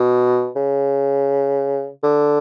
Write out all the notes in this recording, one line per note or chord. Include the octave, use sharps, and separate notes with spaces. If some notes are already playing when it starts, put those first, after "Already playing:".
Already playing: B2
C#3
D3